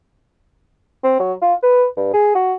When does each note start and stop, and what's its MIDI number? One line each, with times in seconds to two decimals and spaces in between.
1.04 1.18 60
1.19 1.33 54
1.42 1.55 65
1.63 1.86 71
1.97 2.11 43
2.14 2.33 68
2.35 2.55 66